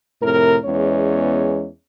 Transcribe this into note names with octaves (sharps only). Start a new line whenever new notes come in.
F2 A2 C3 A#4
E2 G#3 B3 C#4 C#5